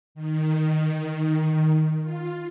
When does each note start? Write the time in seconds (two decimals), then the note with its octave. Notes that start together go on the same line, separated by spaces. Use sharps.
0.15 D#3
2.03 F4